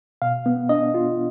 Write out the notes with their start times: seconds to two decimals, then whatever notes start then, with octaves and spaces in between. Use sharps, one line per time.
0.22 B2 F5
0.46 B3
0.69 D4 D#5
0.94 F4